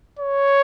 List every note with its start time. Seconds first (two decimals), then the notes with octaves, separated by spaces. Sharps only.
0.19 C#5